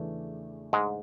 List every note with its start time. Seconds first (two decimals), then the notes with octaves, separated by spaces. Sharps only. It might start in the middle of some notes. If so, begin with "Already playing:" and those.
Already playing: E2 C#3 E3 A3 D4
0.73 G#2 G#3